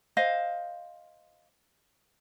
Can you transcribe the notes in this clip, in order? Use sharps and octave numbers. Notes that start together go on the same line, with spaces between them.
C5 D#5 F5